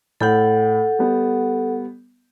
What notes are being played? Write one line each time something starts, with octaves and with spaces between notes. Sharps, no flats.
A2 A4 F#5 G6
G3 B3